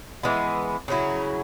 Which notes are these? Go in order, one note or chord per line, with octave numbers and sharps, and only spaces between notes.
E3 G#3 B3 G#4
C#3 F#3 C#4 E4